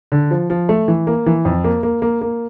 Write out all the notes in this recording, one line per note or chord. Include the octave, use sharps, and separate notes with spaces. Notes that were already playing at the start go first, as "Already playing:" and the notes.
D3
F3
F3
A3
E3
A#3
E3
F2
A#3
A#3
A#3
A#3